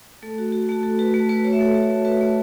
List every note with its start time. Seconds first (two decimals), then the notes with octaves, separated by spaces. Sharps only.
0.23 A3 A4
0.38 F#4
0.52 F#4
0.69 A3 F#4
0.83 F#4 A4
0.99 F#4 B4
1.13 A3 F#4 B4
1.29 A3 F#4 B4
1.44 F#4 C#5
1.53 E5
1.59 A3 A4 C#5
1.75 F#4
1.90 A3
2.05 F#4 B4 E5
2.21 A3